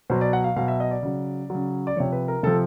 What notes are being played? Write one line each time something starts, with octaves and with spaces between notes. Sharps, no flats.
B2 F#3 C5
D5
F#5
F5
B2 F#3 F5
E5
D#5
D5
C#3 F#3
C#3 F#3
D5
C3 F3 C#5
B4
A#4
C3 F3 A4